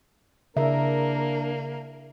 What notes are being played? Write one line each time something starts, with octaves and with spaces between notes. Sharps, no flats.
C#3 A#3 D4 A#4 E5